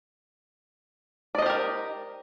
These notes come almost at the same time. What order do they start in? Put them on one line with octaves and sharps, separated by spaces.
D5 D#5 C5 G4 A#4